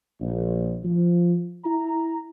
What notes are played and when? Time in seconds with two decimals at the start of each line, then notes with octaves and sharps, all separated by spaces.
0.20 A#1
0.84 F3
1.65 E4 A#5